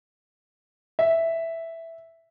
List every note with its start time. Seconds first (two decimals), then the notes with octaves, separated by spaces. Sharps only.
0.99 E5